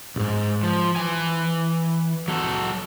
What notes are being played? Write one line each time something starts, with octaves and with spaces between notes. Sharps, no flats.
C2 G#2
F3
E3 G#5
F#3 A4